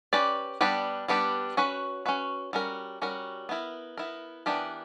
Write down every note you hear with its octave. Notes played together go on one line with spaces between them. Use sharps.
C#4 G4 B4 D5
G3 B3 D4 G4 B4
G3 B3 D4 G4 B4
C#4 F#4 B4
C#4 F#4 B4
G3 C#4 F#4 A#4
G3 C#4 F#4 A#4
B3 E4 A#4
B3 E4 A#4
E3 B3 D4 G4 A#4